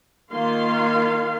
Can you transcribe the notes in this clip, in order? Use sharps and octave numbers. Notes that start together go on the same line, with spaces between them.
D#3 A#3 F4 F5 C6